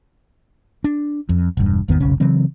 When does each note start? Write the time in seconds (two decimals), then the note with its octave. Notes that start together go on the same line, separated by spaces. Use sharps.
0.84 D4
1.29 F2
1.57 E1 G2
1.88 G#1 E2 D#3 B3
2.00 F1 B1 C#3 C#4
2.20 C#3 E3 F#3 C4